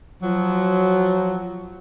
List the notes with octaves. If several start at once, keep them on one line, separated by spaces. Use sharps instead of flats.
F3 F#3